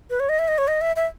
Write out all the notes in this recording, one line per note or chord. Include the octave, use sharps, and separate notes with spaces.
B4
C#5
D#5
E5
D#5
C#5
D#5
E5
E5